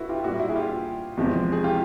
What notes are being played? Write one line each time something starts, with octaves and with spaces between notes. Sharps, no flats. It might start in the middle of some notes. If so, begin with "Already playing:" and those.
Already playing: E4 F#4 A4 B4
F4 G4
G4
A#2 G3 E4 F#4
E4 F#4
G#4
F4 G4
E2 C3 F3 G#3
G#4
F4 G4